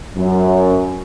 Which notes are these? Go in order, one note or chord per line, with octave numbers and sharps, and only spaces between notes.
F#2